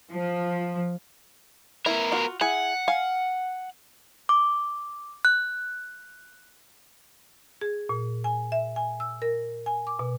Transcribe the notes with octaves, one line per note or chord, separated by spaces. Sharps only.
F3
B3 E4 A#4
F4 F#4
E4 G#4 F#5 G#5
F5 G#5
D6
F#6
G#4
A#2
G#5
E5
G#5
E6
A#4
G#5
D6
B2